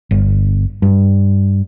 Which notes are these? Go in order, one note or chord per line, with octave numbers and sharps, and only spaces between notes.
G1
G2